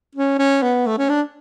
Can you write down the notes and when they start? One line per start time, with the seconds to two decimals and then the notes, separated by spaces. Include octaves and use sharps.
0.15 C#4
0.39 C#4
0.62 B3
0.86 A3
0.98 C#4
1.09 D4